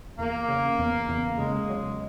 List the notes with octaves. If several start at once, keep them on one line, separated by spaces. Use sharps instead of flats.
E2 A#3
C#3
E2
E2
C#3 G#3
F#3